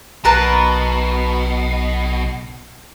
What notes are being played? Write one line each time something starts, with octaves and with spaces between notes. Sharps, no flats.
B1 B2 A#4 B4 A5